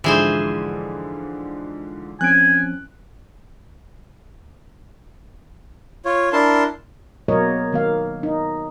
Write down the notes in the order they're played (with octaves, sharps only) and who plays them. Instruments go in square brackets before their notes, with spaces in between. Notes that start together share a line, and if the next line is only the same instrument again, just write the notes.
[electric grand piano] G#2 D3 F3 [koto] E3 G#4 C5
[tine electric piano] F3 C4 C#4 [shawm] G#5 [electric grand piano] F#6 D7
[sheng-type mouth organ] F4 C#5
D4 E4 A#4 A5 C6
[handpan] B2 F#3 A#3 A#4 C#5 D#5
D#3 A#3 F5
D#4